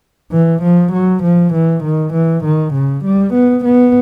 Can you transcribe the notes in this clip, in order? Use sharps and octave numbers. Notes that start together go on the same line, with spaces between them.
E3
F3
F#3
F3
E3
D#3
E3
D#3
C#3
G3
B3
B3